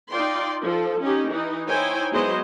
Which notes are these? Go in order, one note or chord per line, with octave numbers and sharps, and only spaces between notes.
D#4 F4 D5 G5 C6
F3 A4
C#4 D#4 G4
E3 D#4
D#4 E4 C5 C#5 G5 G#5
F#3 G#3 B3 E4 C5 D#5